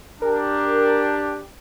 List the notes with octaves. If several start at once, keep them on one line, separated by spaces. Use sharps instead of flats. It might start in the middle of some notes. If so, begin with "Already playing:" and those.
D4 G4 A#4